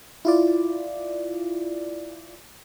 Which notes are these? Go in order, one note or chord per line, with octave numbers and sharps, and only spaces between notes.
E4 F4 D5